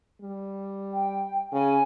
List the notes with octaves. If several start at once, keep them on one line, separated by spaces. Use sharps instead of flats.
G3
G5
C#3 G#5